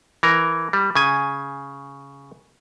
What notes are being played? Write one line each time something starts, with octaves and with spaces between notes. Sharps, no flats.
E3 A#4
G3
C#3 G#5